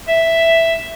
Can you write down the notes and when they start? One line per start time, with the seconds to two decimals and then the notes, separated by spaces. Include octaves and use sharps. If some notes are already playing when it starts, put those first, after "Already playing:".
0.08 E5